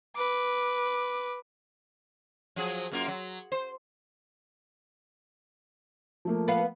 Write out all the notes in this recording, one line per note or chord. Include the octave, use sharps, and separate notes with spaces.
B4 D6
F3 F#3 G#4
F#2 A#3 F4
F#3
C5
F3 A3 A#3
B3 B4 F5